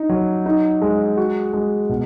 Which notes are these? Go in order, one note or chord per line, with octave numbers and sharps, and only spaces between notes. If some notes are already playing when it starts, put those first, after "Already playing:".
Already playing: D#4
F#3
D#4
G#3
F#4
G#3
B2